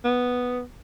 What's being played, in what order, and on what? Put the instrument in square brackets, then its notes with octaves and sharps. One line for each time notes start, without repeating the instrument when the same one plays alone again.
[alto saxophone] B3